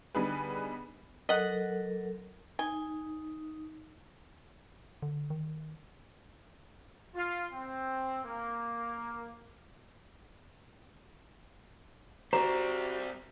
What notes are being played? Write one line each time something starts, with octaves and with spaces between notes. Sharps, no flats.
D3 G3 B3 D#4 G#4 B4
F#3 A4 A#4 D#5 F#5
D#4 G#5
D3
D#3
F4
C4
A#3
G3 C4 F#4 G4 C5 A#5